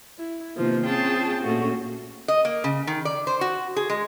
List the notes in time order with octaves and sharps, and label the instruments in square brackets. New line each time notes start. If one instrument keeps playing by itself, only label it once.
[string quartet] E4
C3 D#3 F3 A#3 B3
C4 C#4 F4 G#4 G5 A5
A#2 A3 C#4 F#4
[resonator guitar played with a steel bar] D#5
A#3
C#3
D#3
D5
C5
F#4
G#4
G#3